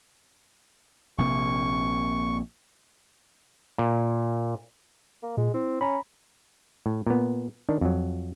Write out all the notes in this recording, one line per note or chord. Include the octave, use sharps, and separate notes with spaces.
A#1 C3 A#3 C#6
A#2
A#3
A#2 G#3
C4 E4
C#4 A#5 B5
A2
A#2 B3
D#3 D4
F2 F#3